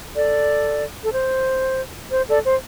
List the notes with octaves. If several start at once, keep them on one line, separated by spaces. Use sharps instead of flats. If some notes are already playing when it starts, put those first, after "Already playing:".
A4 D5
A4
C5
C5
A4 D5
C5